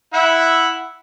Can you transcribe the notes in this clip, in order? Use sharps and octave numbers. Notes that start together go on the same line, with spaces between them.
E4 E5 F#5